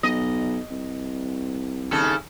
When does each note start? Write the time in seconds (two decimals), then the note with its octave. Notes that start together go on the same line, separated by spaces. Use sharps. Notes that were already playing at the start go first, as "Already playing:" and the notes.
0.03 B1 D#5
0.71 C2
1.91 D#2 C#3 A4